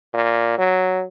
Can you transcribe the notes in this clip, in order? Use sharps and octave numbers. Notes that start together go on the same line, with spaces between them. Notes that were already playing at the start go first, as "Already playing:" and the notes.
A#2
F#3